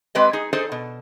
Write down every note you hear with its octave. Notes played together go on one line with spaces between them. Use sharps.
G#3 C4 G4 B4 D5 D#5
D#4 G#4
D#4 G#4 A4 C5 D5
B2